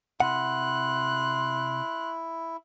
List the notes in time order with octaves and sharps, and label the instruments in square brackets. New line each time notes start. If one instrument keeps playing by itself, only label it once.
[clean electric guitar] C3 F#5 [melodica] E4 [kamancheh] C6 F#6